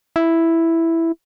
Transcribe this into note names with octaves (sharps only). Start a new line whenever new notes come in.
E4